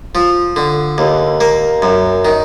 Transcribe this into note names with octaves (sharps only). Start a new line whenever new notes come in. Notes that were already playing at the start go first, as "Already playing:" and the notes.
F3
D3
D#2
A#3
F#2
D#3